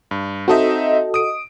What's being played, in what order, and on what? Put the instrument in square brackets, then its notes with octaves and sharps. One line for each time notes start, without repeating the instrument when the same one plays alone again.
[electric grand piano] G2
[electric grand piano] C4 D#4 E5 [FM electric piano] F#4 A4 D#5
[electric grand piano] D#6 D7